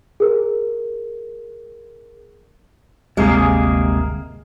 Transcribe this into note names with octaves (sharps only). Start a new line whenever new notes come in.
G#4 A#4
G1 D2 C3 G#3 A#3 G#4